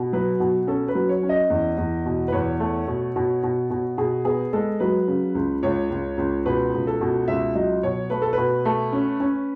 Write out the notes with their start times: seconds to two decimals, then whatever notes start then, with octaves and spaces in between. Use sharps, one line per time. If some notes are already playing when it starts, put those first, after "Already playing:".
Already playing: B2
0.13 F#3 B4
0.40 B2
0.67 C#4 A4
0.88 B4
0.95 F#3
1.09 C#5
1.23 C#4
1.29 D#5
1.50 E2
1.78 E2
2.06 B2
2.28 B4
2.32 E2 C#5
2.60 A3
2.88 B2
3.16 B2
3.43 B2
3.70 B2
3.98 B2 G#4
4.25 B3 G#4
4.53 G#3 A4
4.80 F#3 B4
5.08 C#3
5.35 C#2
5.63 C#2 C#5
5.90 C#2
6.18 C#2
6.46 B2 B4
6.73 C#2
6.87 A4
7.01 B2
7.28 C#2 E5
7.55 F#3 D#5
7.83 B2 C#5
8.10 A3 B4
8.22 A4
8.33 B2 B4
8.65 A3
8.93 C#4
9.20 C#4